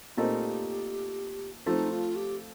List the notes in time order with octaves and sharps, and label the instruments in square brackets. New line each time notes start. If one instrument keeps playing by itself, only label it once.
[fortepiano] A#2 A3 C4 D#4 A#4 [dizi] G4
[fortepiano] F3 A3 C4 [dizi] D#4
[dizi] F4
G4